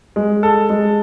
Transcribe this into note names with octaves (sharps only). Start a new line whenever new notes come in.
G#3
A4
G#3